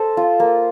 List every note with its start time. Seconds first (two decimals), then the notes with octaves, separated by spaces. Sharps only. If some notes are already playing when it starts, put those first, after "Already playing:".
Already playing: A4 C5 D#5
0.17 F4
0.40 A#3